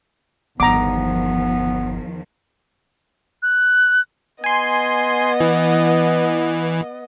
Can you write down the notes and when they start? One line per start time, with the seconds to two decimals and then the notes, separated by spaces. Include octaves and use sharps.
0.60 G1 E2 D3 D#3 F3 B3 A#5 D6
3.43 F#6
4.44 B3 D#5 G#5 C6
5.40 E3